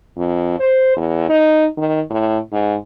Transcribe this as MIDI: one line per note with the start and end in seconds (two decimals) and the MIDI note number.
0.17 0.58 41
0.59 0.93 72
0.97 1.26 40
1.29 1.67 63
1.77 2.01 51
2.10 2.38 45
2.52 2.76 44